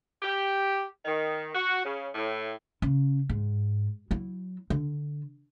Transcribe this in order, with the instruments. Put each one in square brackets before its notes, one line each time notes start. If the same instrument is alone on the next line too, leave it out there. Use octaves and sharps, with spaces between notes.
[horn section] G4
D#3
F#4
C#3
A2
[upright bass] C#3
G#2
F#3 E4
D3